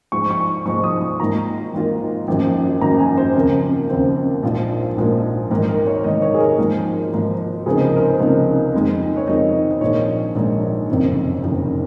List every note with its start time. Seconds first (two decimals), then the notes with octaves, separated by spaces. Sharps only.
0.12 G#2 F3 G#3 C#6
0.31 C#6
0.66 G#2 F3 G#3 C#6
0.84 D#6
1.01 C#6
1.20 G#1 G#2 D#3 A#3 F4 A#5
1.74 G#1 G#2 D#3 A#3 F4
2.28 G#1 F#2 F3 A#3
2.81 G#1 F#2 F3 A#3 A#5
2.99 G#5
3.18 C5
3.35 D#2 C#3 F3 C4 A#4
3.89 D#2 C#3 F3 C4
4.43 A#1 G#2 F3 A#3 F4
4.97 A#1 G#2 F3 A#3 F4
5.51 G#1 G#2 D#3 A#4
5.68 A#4
5.87 C#5
6.04 G#1 G#2 D#3 D#5
6.22 C#5
6.34 G#4
6.40 A#4
6.58 G#1 G#2 F3 A#3 A#4
7.13 G#1 G#2 F3 A#3
7.66 C#2 C3 F3 A#3 D#4 G#4
7.84 A#4
7.96 A#4
8.01 C5
8.20 C#2 C3 F3 A#3 D#4
8.74 F2 D#3 G#3 D#4
9.17 C#5
9.27 F2 D#3 G#3 D#4 D#5
9.71 D#5
9.81 A#1 G#2 D#3 G#3 D#4 C#5
10.35 A#1 G#2 D#3 G#3 D#4
10.89 F#1 F2 C3 D#3
11.42 F#1 F2 C3 D#3